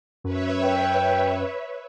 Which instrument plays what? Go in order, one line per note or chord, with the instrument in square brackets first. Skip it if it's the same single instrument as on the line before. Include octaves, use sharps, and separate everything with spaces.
[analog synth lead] F#2 [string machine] B4 C#5 E5
[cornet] G5